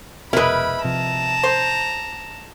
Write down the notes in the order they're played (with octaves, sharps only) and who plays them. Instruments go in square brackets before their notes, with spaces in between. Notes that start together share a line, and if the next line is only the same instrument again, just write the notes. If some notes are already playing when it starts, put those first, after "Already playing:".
[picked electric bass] F1 B2 [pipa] G#3 E4 [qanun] A#4 B4 [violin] B5
[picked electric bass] C3 F3 [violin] A5 A#5
[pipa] C5